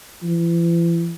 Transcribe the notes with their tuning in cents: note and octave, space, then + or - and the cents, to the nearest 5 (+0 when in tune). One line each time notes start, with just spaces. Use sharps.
E3 +40